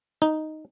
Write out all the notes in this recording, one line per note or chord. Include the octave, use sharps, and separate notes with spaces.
D#4